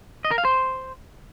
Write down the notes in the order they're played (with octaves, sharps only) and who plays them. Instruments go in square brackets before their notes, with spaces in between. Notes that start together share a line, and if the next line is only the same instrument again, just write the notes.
[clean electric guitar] D#5
A#4
F5
C5